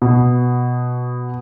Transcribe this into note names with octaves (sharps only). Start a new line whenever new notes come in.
B2